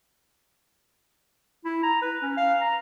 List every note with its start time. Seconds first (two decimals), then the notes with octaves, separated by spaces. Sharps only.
1.65 E4
1.84 A#5
2.02 B4
2.23 C#4
2.38 F5
2.61 A#5